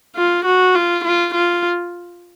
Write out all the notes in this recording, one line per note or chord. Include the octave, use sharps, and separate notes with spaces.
F4
F#4
F4
F4
F4